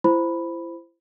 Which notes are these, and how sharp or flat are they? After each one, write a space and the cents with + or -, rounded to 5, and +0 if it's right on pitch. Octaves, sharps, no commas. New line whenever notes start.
E4 +35 C5 -10 B5 +0